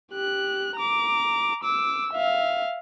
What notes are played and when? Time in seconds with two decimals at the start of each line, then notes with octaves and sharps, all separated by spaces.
0.13 G4 F#6
0.76 A#5 D6
1.64 D6 E6
2.13 E5 F5